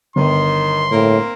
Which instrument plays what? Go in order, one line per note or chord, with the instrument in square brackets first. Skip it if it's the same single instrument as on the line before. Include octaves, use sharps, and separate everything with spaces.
[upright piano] G1 [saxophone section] D#3 [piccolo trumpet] C6
[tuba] A2 [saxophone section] A#3 C4 A#4